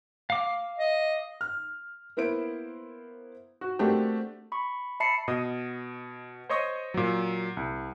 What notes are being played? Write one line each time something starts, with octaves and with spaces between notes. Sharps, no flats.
F5 D6
D#5
F6
A#3 B3 E4 C5 D7
F#4
A3 A#3 C4 D4 F#4 G4
B5 C#6
E5 A5 B5 C7 C#7
B2 D#5 D#6
C5 C#5 D#5 C#6 D#6
A#2 F#3
C2